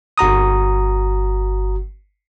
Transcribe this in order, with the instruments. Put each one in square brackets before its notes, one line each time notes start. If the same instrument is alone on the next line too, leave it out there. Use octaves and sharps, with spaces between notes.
[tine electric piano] G1 F#4 A#5 D#6